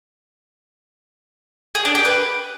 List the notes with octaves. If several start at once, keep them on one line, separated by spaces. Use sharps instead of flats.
G#4
D4
G4
B4